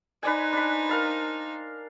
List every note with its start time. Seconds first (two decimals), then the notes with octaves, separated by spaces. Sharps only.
0.23 D#4 B4 C5 D5 G#5
0.53 D4 B5
0.89 A#4 F5 A5